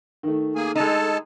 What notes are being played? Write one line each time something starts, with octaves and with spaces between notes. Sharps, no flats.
D#3 A3
A#3 G#4 G#5
G#3 D#4 A4 A5